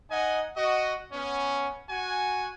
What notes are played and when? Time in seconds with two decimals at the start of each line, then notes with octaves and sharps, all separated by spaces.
0.11 D#4 D#5 F#5 G#5
0.56 F#4 D#5
1.12 B3 C#4
1.90 F#4 G#5